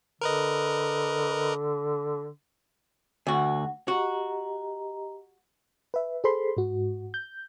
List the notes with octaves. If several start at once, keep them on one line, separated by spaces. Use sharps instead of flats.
D3 A#4 B4 D#5
D2 F#4 F#5
F#4 G4 D#5 A#5
B4 E5
G#4 A4 C5 B5 C6
G#2 F#4
G6